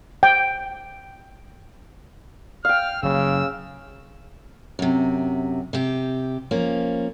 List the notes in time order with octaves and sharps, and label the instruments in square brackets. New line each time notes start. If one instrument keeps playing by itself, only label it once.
[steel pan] G5
[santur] F5 G5 [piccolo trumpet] F6
[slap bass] F#1 [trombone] C#3 [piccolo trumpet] E6
[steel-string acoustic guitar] F#2 C3
C3 G4
F3 A#3 C#4